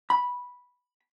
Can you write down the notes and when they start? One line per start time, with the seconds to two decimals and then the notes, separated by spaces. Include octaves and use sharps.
0.10 B5